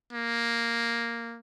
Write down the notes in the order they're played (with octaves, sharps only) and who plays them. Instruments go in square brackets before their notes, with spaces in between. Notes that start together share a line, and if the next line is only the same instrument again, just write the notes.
[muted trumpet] A#3